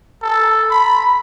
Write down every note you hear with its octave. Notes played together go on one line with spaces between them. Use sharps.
A4
B5